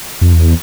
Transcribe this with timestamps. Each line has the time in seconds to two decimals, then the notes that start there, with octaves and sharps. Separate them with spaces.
0.21 F2
0.33 E2